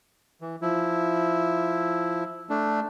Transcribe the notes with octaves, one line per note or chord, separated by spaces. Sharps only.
E3
F3 E4
A3 D4